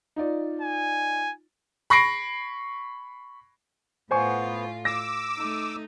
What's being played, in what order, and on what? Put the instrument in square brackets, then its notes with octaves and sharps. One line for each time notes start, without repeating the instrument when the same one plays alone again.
[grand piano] D#4 F4 D5
[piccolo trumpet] G#5
[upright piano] B5 C#6 A#6 C7 D7
[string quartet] A2 F4 [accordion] B3 [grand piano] C5 G#5 C#6
[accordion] D6 E6 [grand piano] A#6
[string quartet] A3 D#4